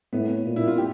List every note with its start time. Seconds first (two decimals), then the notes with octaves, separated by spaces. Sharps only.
0.13 A2 B3
0.45 A#2
0.56 E4
0.67 F4
0.78 G4